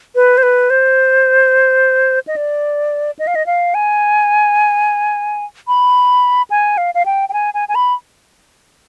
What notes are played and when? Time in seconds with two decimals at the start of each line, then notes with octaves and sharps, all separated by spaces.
0.15 B4
0.38 C5
0.43 B4
0.70 C5
2.27 D#5
2.36 D5
3.19 D#5
3.27 F5
3.35 D#5
3.46 F5
3.74 G#5
5.68 B5
6.50 G#5
6.78 F5
6.95 F5
7.06 G5
7.29 G5
7.33 G#5
7.54 G#5
7.69 G#5
7.75 B5